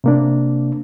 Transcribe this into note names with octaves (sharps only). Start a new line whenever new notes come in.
C3 A#3 D4